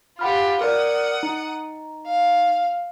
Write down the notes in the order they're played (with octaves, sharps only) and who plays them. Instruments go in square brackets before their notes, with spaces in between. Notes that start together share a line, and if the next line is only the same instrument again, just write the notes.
[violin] F4 G4 [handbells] F#5 B5 F6
[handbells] A#4 D5 [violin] F#5 D#6
[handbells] D#4
[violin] F5